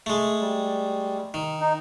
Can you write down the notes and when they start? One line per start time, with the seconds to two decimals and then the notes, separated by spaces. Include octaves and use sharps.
0.06 G#3 A3
0.40 G3
1.34 D#3
1.60 D#4